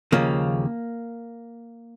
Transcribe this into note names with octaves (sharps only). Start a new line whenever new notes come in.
D#2 C#3 F3 A#3